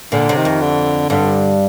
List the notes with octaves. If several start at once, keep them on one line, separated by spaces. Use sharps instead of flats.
A#2 D3
C3
D#3
F2
D3
G2 D3